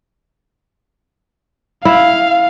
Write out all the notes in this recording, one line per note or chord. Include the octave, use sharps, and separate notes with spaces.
E4 F5